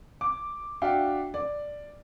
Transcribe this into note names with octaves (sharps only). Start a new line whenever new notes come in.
D6
D4 F#4 E5 F5 G5
D5